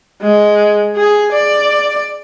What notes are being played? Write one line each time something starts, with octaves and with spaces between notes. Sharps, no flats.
G#3
G#4
D5